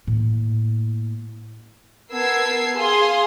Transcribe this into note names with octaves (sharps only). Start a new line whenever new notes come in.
A2 A#3
B3 A#4 A5 E6 G#6 C7
G#4 F5 G#5 C6